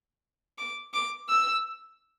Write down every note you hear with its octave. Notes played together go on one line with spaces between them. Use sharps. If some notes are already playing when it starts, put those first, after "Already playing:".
D6
D6
E6